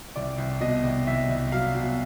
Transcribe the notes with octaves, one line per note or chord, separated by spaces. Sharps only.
C2 D5
C2
B2 D#5
C2
C2 E5
C2
F#3 F5
B2